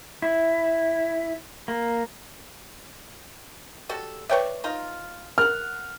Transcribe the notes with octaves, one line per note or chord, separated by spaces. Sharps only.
E4
A#3
G3 F#4 A4
B4 C#5 D5 E5 G5 C#6
D#4 F4 A#5
A#4 F#5 F6